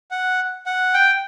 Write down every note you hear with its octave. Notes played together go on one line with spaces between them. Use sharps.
F#5
F#5
G5